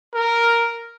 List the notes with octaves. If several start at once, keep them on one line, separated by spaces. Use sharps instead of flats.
A#4